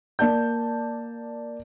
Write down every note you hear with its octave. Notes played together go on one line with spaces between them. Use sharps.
A#3 D5 A5 G6